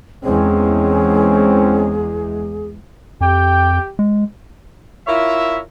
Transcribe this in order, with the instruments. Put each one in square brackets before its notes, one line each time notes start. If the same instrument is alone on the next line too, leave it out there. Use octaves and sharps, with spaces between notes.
[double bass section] E2 G#3 [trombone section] C4 C#4 [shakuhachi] G#4
[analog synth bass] F2 [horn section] G4 G5
[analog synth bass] G#3
[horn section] E4 F4 A#4 C#5 E5